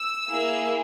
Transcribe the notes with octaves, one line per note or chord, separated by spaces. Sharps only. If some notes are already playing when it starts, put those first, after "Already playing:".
Already playing: E6
A#3 E4 G#4